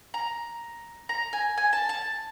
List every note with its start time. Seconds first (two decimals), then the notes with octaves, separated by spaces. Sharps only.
0.14 A#5
1.09 A#5
1.33 G#5
1.57 G#5
1.73 A5
1.89 A5